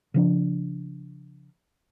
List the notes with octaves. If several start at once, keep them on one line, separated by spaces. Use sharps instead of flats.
C#3 F3 D4